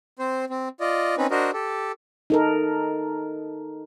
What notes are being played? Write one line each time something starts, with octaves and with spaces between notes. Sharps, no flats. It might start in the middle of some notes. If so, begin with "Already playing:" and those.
C4 C5
C4
F4 D5 D#5
C4 C#4 D#4 B4
D4 F#4 A#4 C5 D#5
G4 A4
D#4 A4 A#4